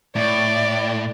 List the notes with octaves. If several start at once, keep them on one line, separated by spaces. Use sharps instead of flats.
A2 D5